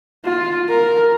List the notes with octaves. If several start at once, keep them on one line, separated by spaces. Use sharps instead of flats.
F4
A#4